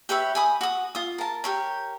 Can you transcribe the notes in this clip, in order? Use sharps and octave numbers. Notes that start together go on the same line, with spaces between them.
G4 B4 C#5 E5
G#5 B5 D#6
F#4 D#6
F4 D#6
A#4 A5
G4 A#4 C#5